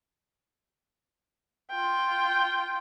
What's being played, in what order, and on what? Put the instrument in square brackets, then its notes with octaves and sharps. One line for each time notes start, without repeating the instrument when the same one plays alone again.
[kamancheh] F4 G5